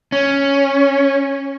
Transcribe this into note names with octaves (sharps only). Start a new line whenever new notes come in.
C#4